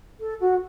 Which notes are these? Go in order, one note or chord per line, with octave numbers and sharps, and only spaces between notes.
A4
F#4